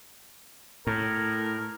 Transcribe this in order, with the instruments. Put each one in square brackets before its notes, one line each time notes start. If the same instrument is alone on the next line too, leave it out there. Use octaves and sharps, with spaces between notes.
[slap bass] A2 [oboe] A#4